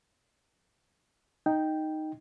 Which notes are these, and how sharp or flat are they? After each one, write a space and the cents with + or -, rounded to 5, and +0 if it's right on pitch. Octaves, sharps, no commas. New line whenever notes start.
D#4 +0 G5 +0